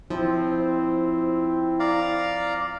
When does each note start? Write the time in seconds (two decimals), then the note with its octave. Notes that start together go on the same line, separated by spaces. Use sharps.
0.10 F3 C4 E4
1.80 D5 F5 A#5